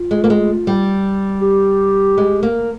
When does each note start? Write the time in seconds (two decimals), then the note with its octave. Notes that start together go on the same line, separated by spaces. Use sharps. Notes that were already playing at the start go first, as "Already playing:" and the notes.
Already playing: F4
0.11 G#3
0.24 A#3
0.30 G#3
0.67 G3
1.42 G4
2.18 G#3
2.43 A#3